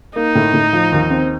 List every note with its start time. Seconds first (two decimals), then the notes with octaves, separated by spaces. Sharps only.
0.16 A#3 D#4
0.35 A2
0.53 A2
0.73 F3
0.92 D#2
1.10 C4